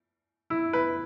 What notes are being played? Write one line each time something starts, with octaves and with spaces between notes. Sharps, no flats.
E4
B4